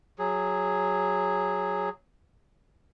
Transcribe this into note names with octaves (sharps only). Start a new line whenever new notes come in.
F#3 G#4